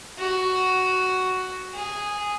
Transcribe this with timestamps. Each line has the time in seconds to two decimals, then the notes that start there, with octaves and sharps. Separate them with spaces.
0.18 F#4
1.74 G#4